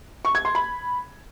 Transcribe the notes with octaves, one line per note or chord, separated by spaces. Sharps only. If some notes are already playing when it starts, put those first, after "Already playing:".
C#6
G#6
C6
B5